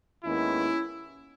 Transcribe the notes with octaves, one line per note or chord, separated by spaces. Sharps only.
D#2 D#3 G#3 B3 C#4 E4